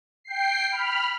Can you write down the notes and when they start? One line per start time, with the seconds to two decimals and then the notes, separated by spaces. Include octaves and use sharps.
0.24 G5 C7
0.71 B5 F6